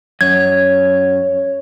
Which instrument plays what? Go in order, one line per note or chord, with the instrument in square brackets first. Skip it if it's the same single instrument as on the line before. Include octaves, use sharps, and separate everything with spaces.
[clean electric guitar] F#2 [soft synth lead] C#5 [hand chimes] G#6